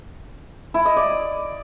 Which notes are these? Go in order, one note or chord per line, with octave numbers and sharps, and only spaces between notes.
E4
D#5
D5